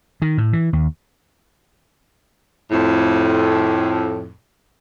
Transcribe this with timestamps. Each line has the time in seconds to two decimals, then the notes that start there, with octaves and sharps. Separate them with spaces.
0.22 D#3
0.38 A2
0.53 E3
0.73 D#2
2.71 F2 A2